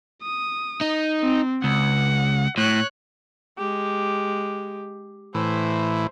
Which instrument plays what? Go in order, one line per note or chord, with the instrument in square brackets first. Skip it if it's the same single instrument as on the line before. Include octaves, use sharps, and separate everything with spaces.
[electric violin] D#6
[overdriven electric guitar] D#4
[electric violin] C4
[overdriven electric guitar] C#2 [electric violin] F#5
[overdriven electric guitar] A2 [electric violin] C#5 F#6
[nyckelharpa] G#3 G4
[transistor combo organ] A2 E3 [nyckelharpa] C5